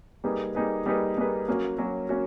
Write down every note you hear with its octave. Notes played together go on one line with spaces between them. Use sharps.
G3 A#3 D#4 G#4 B4
G3 A#3 D#4 G#4 B4
G3 A#3 D#4 G#4 B4
G3 A#3 D#4 G#4 B4
F#3 A#3 C#4 F#4
F#3 A#3 C#4 F#4
A#3 C#4 F#4